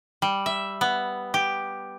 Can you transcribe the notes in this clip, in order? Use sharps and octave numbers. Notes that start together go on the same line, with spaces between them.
G3
E5
B3
G4